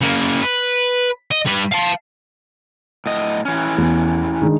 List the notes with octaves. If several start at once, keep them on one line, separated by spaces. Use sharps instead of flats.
C#3 A#3
B4
D#5
G3 B4
F5 A5
A2 D#5
E3 C#4
E2
D#3 G#3 D4